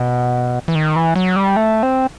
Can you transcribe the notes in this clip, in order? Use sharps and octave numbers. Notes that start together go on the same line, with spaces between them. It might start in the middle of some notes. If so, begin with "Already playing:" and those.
Already playing: B2
E3
D#3
E3
F#3
G3
A3
C4